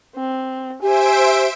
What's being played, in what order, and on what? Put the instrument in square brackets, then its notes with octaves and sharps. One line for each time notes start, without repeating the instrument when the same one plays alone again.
[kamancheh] C4
[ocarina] G4 [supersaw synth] C5 E5 D7 [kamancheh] G#5